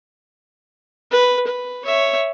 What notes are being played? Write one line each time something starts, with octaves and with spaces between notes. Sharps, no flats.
B4
B4
C#5 E5